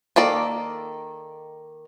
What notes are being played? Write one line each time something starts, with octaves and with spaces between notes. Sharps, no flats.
D#3 A#3 A4 D5